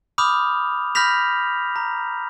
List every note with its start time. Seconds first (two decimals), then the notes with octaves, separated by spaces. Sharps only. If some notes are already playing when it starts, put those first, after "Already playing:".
0.18 B5 D6 D#6 F6 G6 F7
0.95 B5 F6 G6 A#6 B6 F7
1.76 A#5